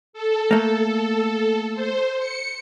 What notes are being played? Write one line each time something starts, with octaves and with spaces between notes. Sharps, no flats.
A4
A3 A#3
C5
C#7